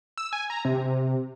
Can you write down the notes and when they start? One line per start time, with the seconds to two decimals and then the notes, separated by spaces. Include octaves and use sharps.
0.17 E6
0.33 G#5
0.50 A#5
0.65 C3